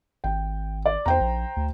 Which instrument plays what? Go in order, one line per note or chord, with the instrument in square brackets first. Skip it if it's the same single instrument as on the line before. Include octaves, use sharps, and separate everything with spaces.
[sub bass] G#1 [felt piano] G5
[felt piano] D5
[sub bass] E2 [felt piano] C5 G5 A#5
[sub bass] A#1
D2